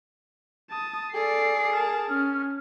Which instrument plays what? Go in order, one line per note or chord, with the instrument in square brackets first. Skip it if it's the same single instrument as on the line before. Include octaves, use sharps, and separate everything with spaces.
[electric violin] A5 D#6
[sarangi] G#4 [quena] A4 [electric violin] D5 C7
[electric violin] A#4 A5
[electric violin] C#4 [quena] F6